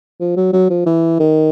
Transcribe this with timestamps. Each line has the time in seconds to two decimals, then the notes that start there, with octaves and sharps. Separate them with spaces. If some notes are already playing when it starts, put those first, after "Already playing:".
0.20 F3
0.37 F#3
0.53 F#3
0.70 F3
0.86 E3
1.20 D#3